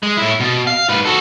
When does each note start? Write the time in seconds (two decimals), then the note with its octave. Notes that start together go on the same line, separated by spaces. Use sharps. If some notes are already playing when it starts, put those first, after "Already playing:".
0.03 G#3
0.17 A2 E4
0.40 B2
0.67 F5
0.89 G#2 B4
1.05 F#4 A4